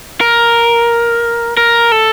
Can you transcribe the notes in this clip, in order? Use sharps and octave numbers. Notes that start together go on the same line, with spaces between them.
A#4
A#4
A4